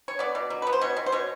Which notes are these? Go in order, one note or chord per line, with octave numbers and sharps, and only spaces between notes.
C#5
B3 D5
B2
F#3
B3 B4
C5
B2 C#5
B2
C5
B2 C#5